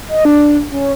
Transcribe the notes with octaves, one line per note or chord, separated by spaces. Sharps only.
D#5
D4
C#4